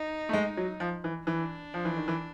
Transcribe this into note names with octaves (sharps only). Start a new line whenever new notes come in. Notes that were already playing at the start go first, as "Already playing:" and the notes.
Already playing: D#4
A3
G#3
F#3
F3
E3
E3 D4
F3
E3
D#3
E3